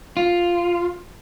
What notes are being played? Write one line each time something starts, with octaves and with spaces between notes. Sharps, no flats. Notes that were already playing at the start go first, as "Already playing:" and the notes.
F4